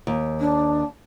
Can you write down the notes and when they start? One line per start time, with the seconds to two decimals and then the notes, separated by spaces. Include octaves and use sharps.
0.07 D#2
0.39 D4